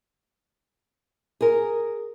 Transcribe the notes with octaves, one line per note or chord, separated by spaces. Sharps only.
G#4 A#4